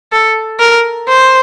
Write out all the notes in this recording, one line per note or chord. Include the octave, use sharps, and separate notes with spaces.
A4
A#4
C5